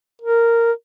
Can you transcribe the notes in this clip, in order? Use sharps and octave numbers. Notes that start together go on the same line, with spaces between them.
A#4